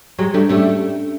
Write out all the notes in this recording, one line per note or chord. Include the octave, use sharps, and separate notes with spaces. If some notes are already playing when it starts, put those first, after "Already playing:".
F#3 G#3 G4
G3 A3 D4
G3 A3 C#4